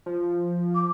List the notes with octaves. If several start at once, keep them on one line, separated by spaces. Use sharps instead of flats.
F3
D6